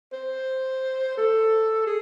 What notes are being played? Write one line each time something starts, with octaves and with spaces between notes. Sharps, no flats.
C5
A4
G#4